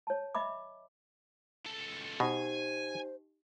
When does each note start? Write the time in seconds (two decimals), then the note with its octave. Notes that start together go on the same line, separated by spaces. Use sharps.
0.07 C#5 A5
0.35 D#5 E5 B5 D6
1.66 C#2 A4
2.20 B2 D#4 G4 C5 G#5